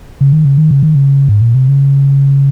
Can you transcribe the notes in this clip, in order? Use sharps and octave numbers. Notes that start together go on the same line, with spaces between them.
C#3
D#3
C#3
D#3
C#3
D#3
C#3
G#2
A#2
C3
C#3